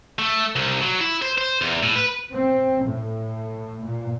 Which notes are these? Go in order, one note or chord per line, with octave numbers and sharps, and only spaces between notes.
A3
C2
F#3
E4
C5
C5
E2
A2
B4
C4
A2
A#2